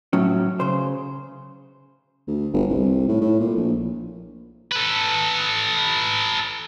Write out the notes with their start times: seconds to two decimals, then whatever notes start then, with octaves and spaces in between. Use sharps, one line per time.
0.13 A2 F#3 C#4
0.60 C#3 C5
2.27 D2
2.53 G1
2.69 C2
3.08 A2
3.21 A2
3.40 A#2
3.56 A#1
4.71 A4 B4